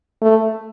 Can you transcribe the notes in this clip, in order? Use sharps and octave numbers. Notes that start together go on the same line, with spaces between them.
A3